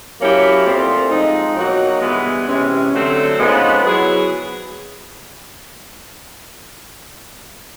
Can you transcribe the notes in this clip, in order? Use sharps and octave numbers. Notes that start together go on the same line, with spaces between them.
F#3 A#3 C#4 E4 G4
A#2 F3 A3 C4
F3 G#3 C4 D#4
B2 F#3 A#3 D#4 F#4
G2 E3 G#3 B3
C3 E3 G#3 C#4
D3 F#3 A3 C4
C#3 F3 G#3 B3 D#4
F#3 B3 E4 G#4